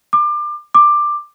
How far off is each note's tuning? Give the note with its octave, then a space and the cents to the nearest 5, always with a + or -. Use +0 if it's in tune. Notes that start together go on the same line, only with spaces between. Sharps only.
D6 +30
D6 +15